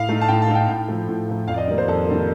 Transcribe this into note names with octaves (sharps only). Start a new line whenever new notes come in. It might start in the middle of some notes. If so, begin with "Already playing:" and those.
Already playing: A2 F5
A3 D#4
A5
A2 G5
A5
A3 D#4
G5
A2 G5
F3 A3
A2
F3 A3
F2 F5
D5
D#5
D#3 G3 A#3 D5
C5
F2 A4
D#3 G3 A#3